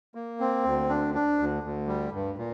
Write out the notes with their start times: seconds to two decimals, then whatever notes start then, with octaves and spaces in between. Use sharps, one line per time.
0.15 A#3
0.40 C4
0.64 D2
0.89 D4
1.14 D4
1.39 D2
1.63 D2
1.88 G3
2.13 G2
2.38 A#2